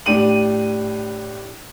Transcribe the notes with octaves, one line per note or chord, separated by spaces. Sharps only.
A2 D4 G4 D#7 F#7